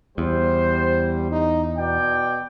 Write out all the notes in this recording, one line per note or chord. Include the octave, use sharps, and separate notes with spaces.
E2 G3 C5
D#4
B2 D5 G5